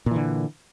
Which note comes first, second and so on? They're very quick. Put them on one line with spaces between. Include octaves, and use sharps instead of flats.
A#2 E3 D3